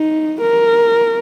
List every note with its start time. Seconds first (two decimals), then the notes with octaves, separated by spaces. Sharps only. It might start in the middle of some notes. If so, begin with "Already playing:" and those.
Already playing: D#4
0.41 A#4